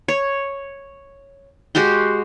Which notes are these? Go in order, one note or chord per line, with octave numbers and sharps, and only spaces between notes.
C#5
G#3 F#4 G4 C6